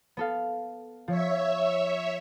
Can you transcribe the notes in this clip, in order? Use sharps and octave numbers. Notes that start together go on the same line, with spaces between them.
B3 A4 F5
F3 C#5 E5